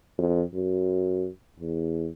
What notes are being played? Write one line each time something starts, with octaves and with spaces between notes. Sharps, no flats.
F2
F#2
E2